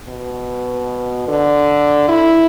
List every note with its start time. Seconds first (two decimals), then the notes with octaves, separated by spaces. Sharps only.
0.08 B2
1.28 D3
2.09 E4